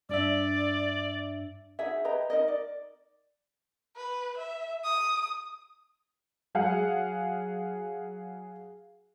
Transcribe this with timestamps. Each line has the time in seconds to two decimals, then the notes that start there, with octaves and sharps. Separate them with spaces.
0.09 G2 D4 D5 E5
1.79 D#4 F#4 G#4 E5
2.04 G4 B4 D#5 A#5
2.30 D#4 A#4 D#5
2.48 D5
3.96 B4
4.37 E5
4.84 D#6
6.55 F#3 G#4 F5 F#5